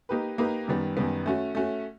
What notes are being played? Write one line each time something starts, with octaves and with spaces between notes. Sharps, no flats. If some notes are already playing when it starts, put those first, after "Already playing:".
A#3 D#4 G4 B4
A#3 D#4 G4 B4
F#2 D#3 G3 B3
F#2 D#3 G3 B3
A3 C#4 F#4
A3 C#4 F#4